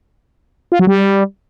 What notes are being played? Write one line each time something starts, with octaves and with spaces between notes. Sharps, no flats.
F4
F#3
G3